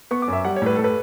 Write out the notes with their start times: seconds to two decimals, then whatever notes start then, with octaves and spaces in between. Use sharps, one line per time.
0.11 B3 C#6
0.22 D6
0.28 F#2
0.33 E5
0.44 G3 F#5
0.56 C#5
0.62 A2 B4
0.76 A2 A4
0.84 B4